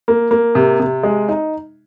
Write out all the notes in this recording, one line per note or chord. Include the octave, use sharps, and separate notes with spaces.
A#3
A#3
C3
C3
G#3
D#4